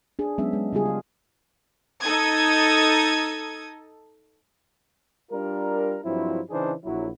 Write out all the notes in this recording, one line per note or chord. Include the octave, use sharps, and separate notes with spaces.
D4 G#4
F#3 G#3 B3 C#4 D4 E5
G#3
C#3 G3 F4 G#4
G4 F5
D#4 A4 D#6 G#6
G3 D4 F4 A#4
G2 F3 F#3 C4 E4
C#3 E3 D4 D#4 G#4 C5
A#1 F#3 E4